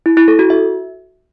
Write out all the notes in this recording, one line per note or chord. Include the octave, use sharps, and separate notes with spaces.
E4
E4
A4
F#4
E5